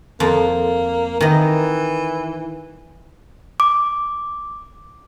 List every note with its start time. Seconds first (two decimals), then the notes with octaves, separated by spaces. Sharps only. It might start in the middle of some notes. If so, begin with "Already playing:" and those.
0.20 F2 A#3
1.21 D#3 E3 D#5
3.60 D6